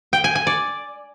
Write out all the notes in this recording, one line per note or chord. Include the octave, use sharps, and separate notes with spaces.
G5
G#5
G#5
D5